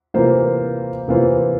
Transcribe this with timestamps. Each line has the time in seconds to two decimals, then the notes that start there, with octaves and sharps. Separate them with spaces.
0.14 C3 E3 A#3 F4 C5
1.08 C3 E3 A#3 F4 C5